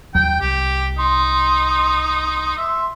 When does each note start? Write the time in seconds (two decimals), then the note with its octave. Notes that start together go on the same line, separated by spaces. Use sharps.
0.15 D#2 F#3 G5
0.41 C2 G4
0.98 D#4 C6
2.57 E5